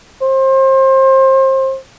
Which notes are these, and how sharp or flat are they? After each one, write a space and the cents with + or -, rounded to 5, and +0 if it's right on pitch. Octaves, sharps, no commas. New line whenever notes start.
C5 +30